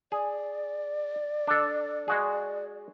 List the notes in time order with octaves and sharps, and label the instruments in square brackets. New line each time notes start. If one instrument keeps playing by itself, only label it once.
[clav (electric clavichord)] G#4 [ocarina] D5
[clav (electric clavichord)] D4 A4
G#3 F#4 G#4